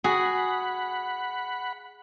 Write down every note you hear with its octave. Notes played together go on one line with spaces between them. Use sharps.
F#4 G#4 F#5 B5